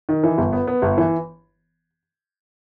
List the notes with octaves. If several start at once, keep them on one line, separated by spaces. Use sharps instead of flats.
D#3
E3
G1
B3
B3
G1
E3